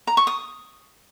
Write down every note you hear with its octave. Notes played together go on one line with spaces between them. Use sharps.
A#5
C#6
D#6